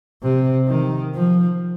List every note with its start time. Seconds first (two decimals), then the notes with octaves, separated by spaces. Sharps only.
0.22 C3
0.68 D#3
1.14 F3